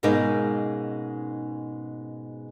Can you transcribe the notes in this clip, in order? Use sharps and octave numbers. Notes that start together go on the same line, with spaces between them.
G#2 B2 G#3 A#3 C#4 D#4